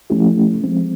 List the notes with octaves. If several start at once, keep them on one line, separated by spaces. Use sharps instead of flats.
F3 A3 C#4 E4 G4
F3 G#3 C4